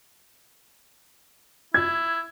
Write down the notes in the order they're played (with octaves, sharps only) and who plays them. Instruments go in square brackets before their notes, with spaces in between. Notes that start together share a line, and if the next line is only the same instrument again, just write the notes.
[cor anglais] E4 [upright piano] G#6